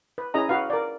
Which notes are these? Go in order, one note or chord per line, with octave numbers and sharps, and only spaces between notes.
B4
C#4 E4 G#4 D#5 A#5
F#4 B4 F5
A#4 D5